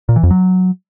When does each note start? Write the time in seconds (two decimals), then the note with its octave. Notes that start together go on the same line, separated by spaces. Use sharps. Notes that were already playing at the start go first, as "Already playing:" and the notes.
0.09 A#2
0.16 E3
0.23 F2
0.31 F#3